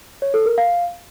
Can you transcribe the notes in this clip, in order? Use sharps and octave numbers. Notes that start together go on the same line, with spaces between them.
C#5
A4
A#4
F5